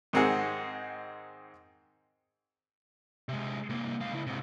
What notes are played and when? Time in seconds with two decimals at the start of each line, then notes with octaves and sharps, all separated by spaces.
0.13 G#2 D#3 C4 D#4 G#4 F#5
3.29 C3 G#3
3.70 C2 A#3
4.01 G#3 F5
4.12 C#3 E4
4.27 G#2 C3